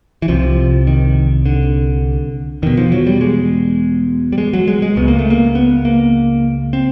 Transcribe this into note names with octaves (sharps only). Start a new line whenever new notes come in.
E3
C2 C3 F3
D#3
D3
E2 B2 D#3
F3
F#3
G3
G#3
G3
G#3
F#3
G#3
G#3
C#2 C#3 B3
A#3
A3
A#3
B3
A#3
C4